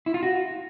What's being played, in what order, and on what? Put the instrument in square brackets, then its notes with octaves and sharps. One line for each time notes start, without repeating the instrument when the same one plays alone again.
[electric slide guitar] E4
F4
F#4